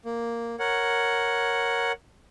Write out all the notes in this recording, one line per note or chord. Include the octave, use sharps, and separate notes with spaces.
A#3
A#4 C#5 F#5